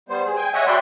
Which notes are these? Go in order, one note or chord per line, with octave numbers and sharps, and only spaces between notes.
G3 B3 C5
G#4
G5 G#5
C#5 D#5 E5 F#5 G#5
F#4 D5 E5 G5 B5 C6